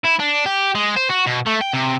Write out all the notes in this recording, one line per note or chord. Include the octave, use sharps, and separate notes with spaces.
E4
D4
G4
G#3
C5
F#4
B2
A3
G5
C3